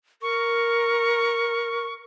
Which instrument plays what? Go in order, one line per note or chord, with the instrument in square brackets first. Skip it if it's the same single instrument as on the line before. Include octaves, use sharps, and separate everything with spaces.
[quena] A#4 [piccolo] C#6